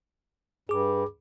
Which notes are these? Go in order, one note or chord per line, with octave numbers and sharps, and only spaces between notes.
G2 G#4 D6